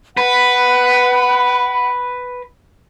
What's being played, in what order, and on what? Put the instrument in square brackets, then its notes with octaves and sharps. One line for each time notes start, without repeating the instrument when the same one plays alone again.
[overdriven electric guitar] B4 [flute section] F#5 B5